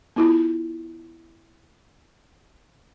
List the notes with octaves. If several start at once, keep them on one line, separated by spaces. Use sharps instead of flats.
B3 E4 F4